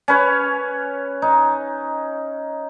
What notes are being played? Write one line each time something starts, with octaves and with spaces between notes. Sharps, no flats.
C#4 B4 C#5
D#4